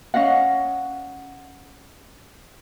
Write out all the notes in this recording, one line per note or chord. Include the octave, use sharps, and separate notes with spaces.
C#4 D#5 F5 F#5